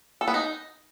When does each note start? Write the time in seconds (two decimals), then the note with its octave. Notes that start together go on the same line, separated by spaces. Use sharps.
0.21 A4
0.28 B3
0.34 D#4